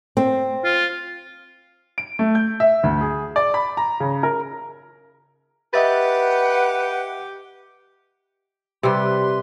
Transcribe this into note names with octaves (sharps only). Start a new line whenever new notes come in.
C4
F4
D7
A3
G6
E5
D2
G#4
D5
B5
A#5
C#3
A#4
G4 B4 D#5 E5 F#5 A6
C3 G3 B4 C6